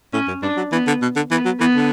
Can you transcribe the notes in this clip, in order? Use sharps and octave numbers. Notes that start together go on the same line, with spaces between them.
A2 C#4
F#2
G2 D4
F#3
E3 B3
D3
B2
D3
E3 B3
F#3
E3 B3
D3